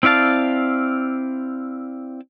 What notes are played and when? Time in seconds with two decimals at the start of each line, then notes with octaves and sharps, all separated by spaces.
0.03 C4 E4 D5 F5 A5